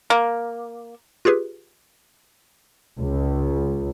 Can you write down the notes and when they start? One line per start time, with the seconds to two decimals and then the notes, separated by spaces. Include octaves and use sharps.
0.10 A#3
1.25 F4 G4 G#4 B4
3.00 C#2